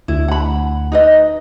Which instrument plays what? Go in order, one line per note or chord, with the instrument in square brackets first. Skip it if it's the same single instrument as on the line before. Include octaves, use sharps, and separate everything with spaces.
[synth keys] D2 [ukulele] E4
[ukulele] F#5 B5
D#4 B4 D#5